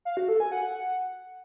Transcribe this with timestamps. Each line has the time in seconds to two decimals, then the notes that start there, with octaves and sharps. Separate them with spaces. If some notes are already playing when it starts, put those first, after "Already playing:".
0.05 F5
0.17 F#4
0.29 A4
0.40 G#5
0.52 F#5